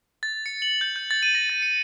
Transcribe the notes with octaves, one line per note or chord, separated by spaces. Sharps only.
A6
C#7
F#7
G6
G6
A6
D#7
A#6
A6
C#7